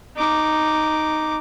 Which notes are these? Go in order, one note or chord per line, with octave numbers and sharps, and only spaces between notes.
D#4 D6